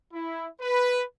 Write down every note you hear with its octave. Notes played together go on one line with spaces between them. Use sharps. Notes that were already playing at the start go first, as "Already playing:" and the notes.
E4
B4